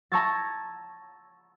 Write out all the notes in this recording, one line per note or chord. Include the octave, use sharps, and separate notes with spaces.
A5 A#5 C#6 E6 G#6 A6